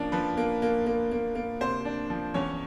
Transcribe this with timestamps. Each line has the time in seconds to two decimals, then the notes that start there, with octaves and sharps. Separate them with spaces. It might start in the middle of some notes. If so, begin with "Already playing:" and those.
Already playing: F3 A#3 C#4 D4
0.12 F3 B4
0.37 A#3
0.62 A#3
0.87 A#3
1.12 A#3
1.35 A#3
1.60 C3 C5
1.85 D4
2.10 F3
2.34 E2 C#4 C#5